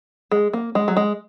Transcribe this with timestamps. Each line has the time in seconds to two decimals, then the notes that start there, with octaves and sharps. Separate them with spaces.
0.31 G#3
0.53 A#3
0.75 G#3
0.88 F#3
0.97 G#3